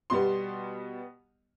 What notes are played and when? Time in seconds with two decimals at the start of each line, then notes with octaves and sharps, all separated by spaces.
0.10 B2 G3 B3 C6